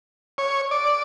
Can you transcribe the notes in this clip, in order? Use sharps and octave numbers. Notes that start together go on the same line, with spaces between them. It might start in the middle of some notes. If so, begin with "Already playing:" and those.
C#5
D5